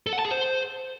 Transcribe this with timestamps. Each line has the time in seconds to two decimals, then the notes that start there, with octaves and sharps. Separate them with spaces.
0.07 A4
0.13 F#5
0.19 A5
0.25 G#4
0.31 C5